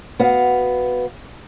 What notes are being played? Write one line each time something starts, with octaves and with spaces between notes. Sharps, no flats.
B3 F#4 F5